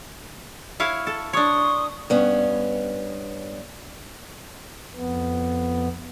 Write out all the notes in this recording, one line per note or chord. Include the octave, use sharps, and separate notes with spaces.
E4 C#5 F5
A4
D4 C#5 C6 C#6 D#6
G2 B3 C#4
F2 B3